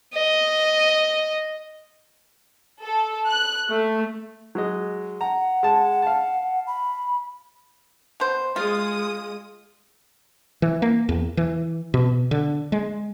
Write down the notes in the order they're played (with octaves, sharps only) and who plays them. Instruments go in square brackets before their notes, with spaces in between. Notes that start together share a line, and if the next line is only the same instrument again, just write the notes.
[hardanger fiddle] D#5
[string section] A4
F#6
A3
[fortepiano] F#3 G#3 D#5
[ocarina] F#5 [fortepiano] A#5
[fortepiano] G#3 A5
F5 A5
[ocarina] B5
[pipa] B2 C5
[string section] G#3 D#6 [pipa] F4
[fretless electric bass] E3
A#3
E2
E3
B2
D3
G#3